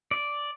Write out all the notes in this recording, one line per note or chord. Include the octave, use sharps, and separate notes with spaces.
D5